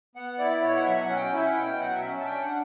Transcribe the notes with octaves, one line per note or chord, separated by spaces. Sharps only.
B3 F#5
E4 D5
B2 C#5
F#5
F#3 E5
F#5
C#4
G5
E4 E5
F#5
B2 G5
F#3 F#5
E5
C#4
E5
A5
D4 G5
F#5